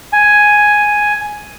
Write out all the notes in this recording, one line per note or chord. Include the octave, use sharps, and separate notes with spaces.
G#5